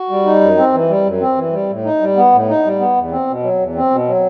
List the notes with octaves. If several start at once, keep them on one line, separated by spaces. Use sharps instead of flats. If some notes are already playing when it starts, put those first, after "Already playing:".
Already playing: F#4
G3
D#4
F#2
C4
E3
G3
F#2
C4
E3
G3
A2
D#4
G3
B3
A2
D#4
G3
B3
E2
C4
B2
F#3
E2
C4
B2
F#3